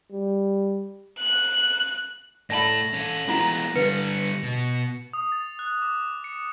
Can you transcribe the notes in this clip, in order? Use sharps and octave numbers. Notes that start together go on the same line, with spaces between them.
G3
F#6
A2 A4 D5 A5 B5 A#6 F#7
C#4 A4
G#3 B3 E4 F4 A#5
D3 G3 B4 C#7
B2
D#6
A6
F#6
D6
C#7